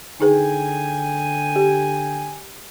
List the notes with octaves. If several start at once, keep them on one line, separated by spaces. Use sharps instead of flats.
D3 D#4 G#4 B4 G5 G#5
G4